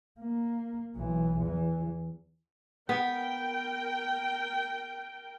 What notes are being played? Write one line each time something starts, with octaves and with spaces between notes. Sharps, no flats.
A#3
B1 E3
E2 E3
B3 A#4 G5